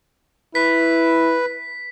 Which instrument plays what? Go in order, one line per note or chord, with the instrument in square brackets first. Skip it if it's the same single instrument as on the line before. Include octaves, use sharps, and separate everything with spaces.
[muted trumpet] E4 [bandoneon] B4 [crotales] B6